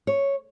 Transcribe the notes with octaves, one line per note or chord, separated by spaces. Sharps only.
C#5